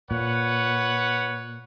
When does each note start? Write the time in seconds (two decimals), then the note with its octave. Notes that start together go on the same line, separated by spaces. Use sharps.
0.11 A#2 B4 C#5 F#5